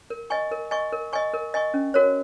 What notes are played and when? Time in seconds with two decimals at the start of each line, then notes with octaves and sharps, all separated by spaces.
0.10 A#4
0.30 D#5 G#5 C#6
0.52 A#4
0.71 D#5 G#5 C#6
0.93 A#4
1.13 D#5 G#5 C#6
1.34 A#4
1.54 D#5 G#5 C#6
1.74 C#4
1.94 F#4 A#4 C#5